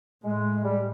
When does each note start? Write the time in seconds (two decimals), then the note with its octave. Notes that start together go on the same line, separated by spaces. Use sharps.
0.24 A2 G#3
0.63 G3